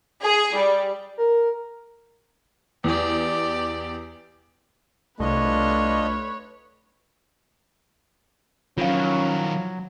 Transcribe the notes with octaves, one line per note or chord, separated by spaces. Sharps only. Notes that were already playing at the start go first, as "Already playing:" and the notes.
G#4
G3
A#4
E2 G4 D5
C2 A3 D4 F4 B4 C#5 D#5
D#3 F3 F#3 C#4 F4 F5